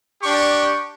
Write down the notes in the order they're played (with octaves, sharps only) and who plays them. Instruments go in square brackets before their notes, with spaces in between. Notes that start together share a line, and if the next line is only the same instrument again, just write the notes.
[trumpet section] D4 G4 C#6